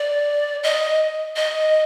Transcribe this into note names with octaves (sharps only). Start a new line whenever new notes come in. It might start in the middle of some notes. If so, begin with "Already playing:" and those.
Already playing: D5
D#5
D#5